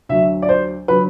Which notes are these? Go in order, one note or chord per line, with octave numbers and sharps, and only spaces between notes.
D2 D3 F#3 E5
D5
C5
D3 F#3 B4